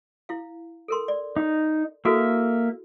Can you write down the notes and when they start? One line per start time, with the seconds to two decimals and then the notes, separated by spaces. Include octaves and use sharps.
0.29 E4 F5
0.88 A4 A#4 C6
1.08 D5
1.36 D#4
2.05 A#3 E4 F#4 A4 E5